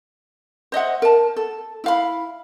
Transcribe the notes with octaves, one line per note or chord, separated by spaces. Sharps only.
C5 D#5 E5 F#5
A#4 A5
A4
E4 F5 B5